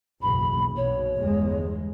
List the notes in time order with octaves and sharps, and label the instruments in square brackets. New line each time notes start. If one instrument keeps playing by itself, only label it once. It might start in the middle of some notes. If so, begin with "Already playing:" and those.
[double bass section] F#1 B1 E2 [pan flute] B5
[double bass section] B1 B2 [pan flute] C#5
[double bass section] G1 E2 G#3